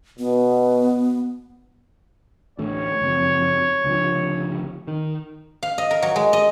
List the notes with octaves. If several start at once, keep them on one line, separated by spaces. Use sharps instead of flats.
B2 B3
A1 D2 A3 C#5
F#1 F2
C#2 D3 F3
D#3
F5
D#5
A#4
F#3
G#3
D#5